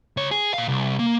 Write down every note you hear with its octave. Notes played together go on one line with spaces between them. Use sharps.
C#2 C#5
G#4
A#2 F5
C2
A#3